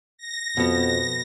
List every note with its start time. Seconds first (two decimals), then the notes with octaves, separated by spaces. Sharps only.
0.17 A#6
0.57 F2 B2 B3